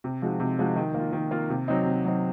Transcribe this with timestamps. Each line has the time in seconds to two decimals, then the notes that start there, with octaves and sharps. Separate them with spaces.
0.04 C3
0.22 F3 G#3 D#4 F#4
0.40 C3
0.59 F3 G#3 D#4 F#4
0.76 D#3
0.94 A#3 F4
1.13 D#3
1.31 A#3 F4
1.50 C3
1.68 F#3 C4 D#4
1.86 C3
2.05 F#3 C4 D#4